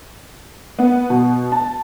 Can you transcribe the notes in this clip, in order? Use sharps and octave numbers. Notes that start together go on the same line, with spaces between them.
B3
B2
A5